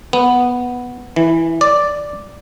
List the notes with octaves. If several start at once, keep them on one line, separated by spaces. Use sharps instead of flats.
B3
E3
D5